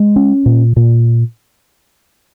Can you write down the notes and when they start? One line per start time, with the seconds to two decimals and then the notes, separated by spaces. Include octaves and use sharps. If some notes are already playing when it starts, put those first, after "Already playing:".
Already playing: G#3
0.16 C#4
0.46 A#2
0.76 A#2